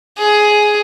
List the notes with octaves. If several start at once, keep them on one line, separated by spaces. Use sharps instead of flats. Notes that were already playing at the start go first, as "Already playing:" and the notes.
G#4